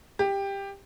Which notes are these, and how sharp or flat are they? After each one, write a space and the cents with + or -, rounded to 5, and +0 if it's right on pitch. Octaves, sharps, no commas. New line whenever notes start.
G4 +10